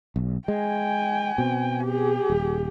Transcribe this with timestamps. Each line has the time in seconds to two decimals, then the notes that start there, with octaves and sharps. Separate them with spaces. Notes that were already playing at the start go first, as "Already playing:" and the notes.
0.16 B1
0.48 G#3 G5 G#5
1.38 B2 C4
1.84 G4 G#4
2.30 D#1